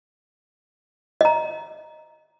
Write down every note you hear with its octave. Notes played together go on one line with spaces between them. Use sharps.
D#5 A#5